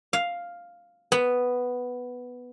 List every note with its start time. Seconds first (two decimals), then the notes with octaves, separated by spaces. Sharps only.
0.13 F5
1.12 B3